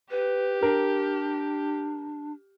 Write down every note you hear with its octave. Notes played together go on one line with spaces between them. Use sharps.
G4 B4
D4 A#4